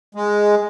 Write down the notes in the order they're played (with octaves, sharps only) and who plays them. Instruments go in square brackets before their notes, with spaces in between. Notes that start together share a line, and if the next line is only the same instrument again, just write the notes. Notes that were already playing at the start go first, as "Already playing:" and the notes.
[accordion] G#3